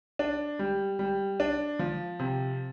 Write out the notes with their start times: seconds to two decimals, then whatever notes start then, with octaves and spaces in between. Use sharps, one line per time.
0.19 D4
0.59 G3
0.99 G3
1.40 D4
1.79 F3
2.19 C3